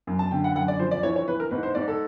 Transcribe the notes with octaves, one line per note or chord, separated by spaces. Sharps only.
F#2
A5
D3 G5
F#5
F#2 F#5
D5
F3 C5
D5
E3 C#5
C#5
E3 B4
A#4
G#2 B4
C5
G#2 D5
A4